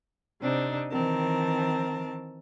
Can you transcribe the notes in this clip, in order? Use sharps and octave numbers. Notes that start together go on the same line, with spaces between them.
C3 C4 D4 D#4
D#3 E3 C4 A#4 A5